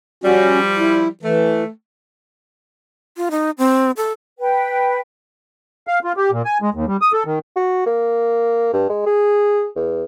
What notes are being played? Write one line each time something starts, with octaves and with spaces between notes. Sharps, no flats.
F3 G3 C#4 F#4
E4
E3 A3
F4
D#4
C4
A4
B4 G5
F5
F4
G4
A#2
G#5
G#3
D#2
G3
D#6
A4
D#3
F#4
A#3
G2
G#3
G#4
E2